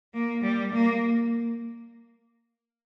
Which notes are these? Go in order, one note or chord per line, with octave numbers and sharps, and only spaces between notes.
A#3
G3
A#3